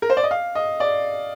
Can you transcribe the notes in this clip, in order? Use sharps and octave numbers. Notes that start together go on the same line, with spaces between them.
A#4
C5
D5
D#5
F5
D#5
D5